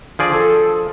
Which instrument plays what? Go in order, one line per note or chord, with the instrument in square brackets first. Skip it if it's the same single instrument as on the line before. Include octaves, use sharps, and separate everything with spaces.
[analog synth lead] D3 [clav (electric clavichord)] F3 G#4 D5
[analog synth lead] A4